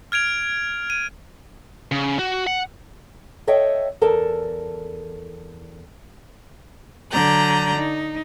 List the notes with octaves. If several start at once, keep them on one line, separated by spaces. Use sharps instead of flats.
F6 G#6 D7 F7
D#7
C#3
F#4
F#5
A4 C#5 D#5 E5 G5
E2 A4 A#4 A5
D3 F#3 D5 A#5 G6
D#4